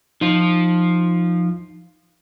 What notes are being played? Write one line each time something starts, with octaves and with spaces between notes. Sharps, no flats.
F3 D#4 F4